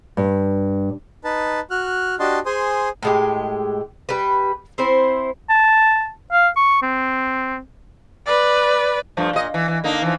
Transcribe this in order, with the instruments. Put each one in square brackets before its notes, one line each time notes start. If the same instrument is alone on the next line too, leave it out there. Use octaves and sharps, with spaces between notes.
[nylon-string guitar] G2
[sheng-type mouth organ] D#4 B4 A5
F#4 F6 F#6
D4 F#4 G4 D#5 A5 C6
G#4 C5 G#5 C6 D#6
[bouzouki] A2 G#3 G4
G3 B4
C4 E4 C5
[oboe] A5
F5
C#6
C4
[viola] B4 D5
[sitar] G2 F3 A3
A#2 D#5
E3
E3
D3 A#3 D#4
E3 F3